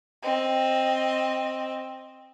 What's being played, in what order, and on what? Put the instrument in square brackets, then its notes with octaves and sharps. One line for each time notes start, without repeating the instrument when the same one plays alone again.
[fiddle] C4 D#5